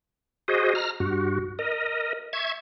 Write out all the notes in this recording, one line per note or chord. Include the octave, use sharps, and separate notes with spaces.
F#4 G#4 C5 D#5
A#5 F6
G2 F#4
A#4 D#5
E5 C#6 G#6